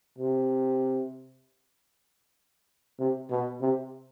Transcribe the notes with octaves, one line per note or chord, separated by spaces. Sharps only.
C3
C3
B2
C3